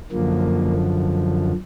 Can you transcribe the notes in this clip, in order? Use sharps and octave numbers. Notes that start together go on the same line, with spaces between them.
F#2 D3 F3 A#3